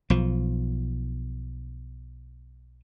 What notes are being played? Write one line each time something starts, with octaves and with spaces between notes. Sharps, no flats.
B1 F3